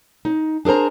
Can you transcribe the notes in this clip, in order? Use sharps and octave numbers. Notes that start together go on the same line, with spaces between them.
D#4
D4 G#4 A#4 C5 A#5